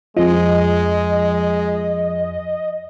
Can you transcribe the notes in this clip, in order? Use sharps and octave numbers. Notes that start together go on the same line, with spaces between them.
F2 F3 G#3 D#5